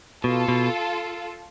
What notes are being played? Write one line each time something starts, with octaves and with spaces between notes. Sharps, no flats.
B2 F4 A4
B2